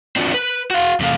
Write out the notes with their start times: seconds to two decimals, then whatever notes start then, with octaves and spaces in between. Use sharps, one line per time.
0.16 C4 D4 F4 F#4
0.34 B4
0.71 F#4 F5
1.00 E2 C3 G3 A3 F5